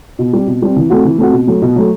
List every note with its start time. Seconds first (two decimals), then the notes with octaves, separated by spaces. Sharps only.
0.19 B2
0.33 G3 C4
0.47 B2
0.62 G3 C4
0.76 E3
0.90 A3 C4 F#4
1.05 E3
1.18 A3 C4 F#4
1.33 B2
1.47 F#3 A3
1.62 B2
1.76 F#3 A3